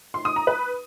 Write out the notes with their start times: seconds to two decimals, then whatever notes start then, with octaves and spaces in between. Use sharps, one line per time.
0.14 C6
0.25 D#6
0.36 A#5
0.47 B4